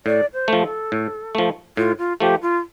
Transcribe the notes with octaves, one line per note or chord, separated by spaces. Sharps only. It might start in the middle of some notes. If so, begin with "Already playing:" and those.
A2 D5
C5
F3 A3
A4
A2
F3 A3
A2 F4
F4
F3 A3 G4
F4